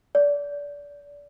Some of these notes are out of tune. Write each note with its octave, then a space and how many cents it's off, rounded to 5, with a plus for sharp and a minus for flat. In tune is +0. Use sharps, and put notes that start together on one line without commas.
D5 -25